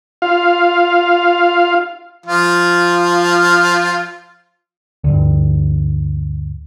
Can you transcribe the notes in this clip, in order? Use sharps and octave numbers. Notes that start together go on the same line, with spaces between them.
F4 F5
F3 F4
D2 G2